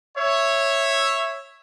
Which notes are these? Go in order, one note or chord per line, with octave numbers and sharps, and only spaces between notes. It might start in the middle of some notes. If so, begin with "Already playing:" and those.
C#5 E5